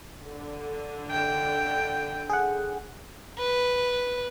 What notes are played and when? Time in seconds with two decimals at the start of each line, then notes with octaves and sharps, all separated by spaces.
0.24 D3
1.11 G5
2.30 G#4 F#5
3.38 B4